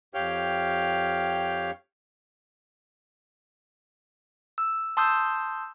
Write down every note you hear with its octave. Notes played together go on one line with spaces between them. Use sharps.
F2 G4 C#5 F5 G5 F6
E6
A5 C6 D#6 E6 G6